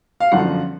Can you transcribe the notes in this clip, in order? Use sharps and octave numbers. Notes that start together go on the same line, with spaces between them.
F5
G1 F#2 D3 F3 F#5